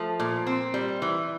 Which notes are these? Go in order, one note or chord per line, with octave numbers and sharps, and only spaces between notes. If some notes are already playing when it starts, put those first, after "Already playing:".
Already playing: F3 A3
A#2
C4
G3
E3